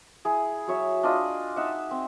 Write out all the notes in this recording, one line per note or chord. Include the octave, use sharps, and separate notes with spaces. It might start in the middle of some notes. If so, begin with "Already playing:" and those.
E4 G#4
F#3 C#5 E5
D4 F4 D#5 B5
D#4 E5 F#5
C4